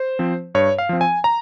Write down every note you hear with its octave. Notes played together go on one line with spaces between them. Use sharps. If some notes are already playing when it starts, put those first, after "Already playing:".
Already playing: C5
F3 C4
G2 C#5
F5
F3 C4
G#5
A#5